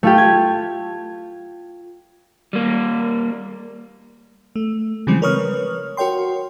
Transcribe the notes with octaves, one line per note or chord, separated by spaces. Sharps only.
A3 F4 G4
G#6
G3 A#3
A3
C#3 E3 F3 G3 G#3 C4
A#4 B4 C#5 C#6 D#6 F6
F#4 A#4 C#5 G5 C6